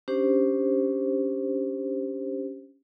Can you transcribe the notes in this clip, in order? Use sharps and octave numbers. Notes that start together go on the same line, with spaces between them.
C#4 D4 G4 C5